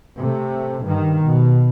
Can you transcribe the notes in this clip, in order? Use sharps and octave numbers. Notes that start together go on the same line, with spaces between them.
C3 A3
G2 D#3
B2